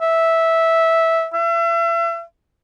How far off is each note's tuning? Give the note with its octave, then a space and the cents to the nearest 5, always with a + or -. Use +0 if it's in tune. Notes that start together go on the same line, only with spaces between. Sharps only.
E5 -10
E5 +35